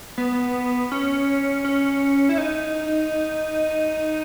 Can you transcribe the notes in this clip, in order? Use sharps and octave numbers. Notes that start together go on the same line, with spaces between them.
B3
C#4
C#4
E4
D#4